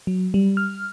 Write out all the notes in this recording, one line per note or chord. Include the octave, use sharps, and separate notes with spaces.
F#3
G3
F6